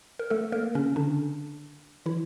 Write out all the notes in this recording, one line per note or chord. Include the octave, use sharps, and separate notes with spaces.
A#4
A3 A4
A#3 A#4
C#3 C#4
D3 D4
E3 E4